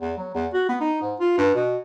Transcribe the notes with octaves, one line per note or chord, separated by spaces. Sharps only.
E2
F#3
E2
F#4
B3
D#4
G#2
F4
G2
B2